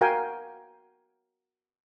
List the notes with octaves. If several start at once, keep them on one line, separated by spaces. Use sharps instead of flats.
F#4 A#4 F5 G5 G#5